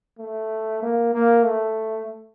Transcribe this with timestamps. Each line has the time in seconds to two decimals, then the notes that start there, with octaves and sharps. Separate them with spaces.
0.19 A3
0.82 A#3
1.14 A#3
1.45 A3